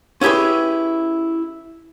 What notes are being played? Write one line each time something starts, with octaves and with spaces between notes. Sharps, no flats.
C#4 E4 G4 G#4 B4